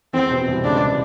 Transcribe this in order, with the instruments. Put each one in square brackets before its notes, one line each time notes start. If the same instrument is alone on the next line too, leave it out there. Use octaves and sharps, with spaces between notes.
[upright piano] E2 E3 [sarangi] C4
[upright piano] B2
C2 C3
[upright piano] C#2 C#3 [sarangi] D4
[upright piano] B2